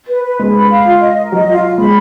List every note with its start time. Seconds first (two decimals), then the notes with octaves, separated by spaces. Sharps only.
0.08 B4
0.24 B4
0.39 G#3 B4
0.54 B5
0.70 F5
0.85 F4
1.01 D#5
1.17 A#4
1.32 F#3 D#5
1.48 F4
1.63 F4
1.78 G#3 B5